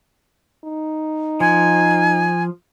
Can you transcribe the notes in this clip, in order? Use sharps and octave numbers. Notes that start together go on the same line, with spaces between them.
D#4
F3 G#5